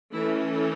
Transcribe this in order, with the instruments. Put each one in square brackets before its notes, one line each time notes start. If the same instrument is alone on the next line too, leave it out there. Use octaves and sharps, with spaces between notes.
[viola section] E3 A3 C#4 E4